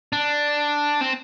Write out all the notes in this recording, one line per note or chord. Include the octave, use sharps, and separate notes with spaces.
D4
C4